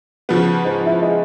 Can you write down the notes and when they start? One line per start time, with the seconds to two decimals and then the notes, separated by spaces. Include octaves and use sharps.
0.29 C#3 F3 B3
0.64 G#2
0.86 E4
1.02 G#3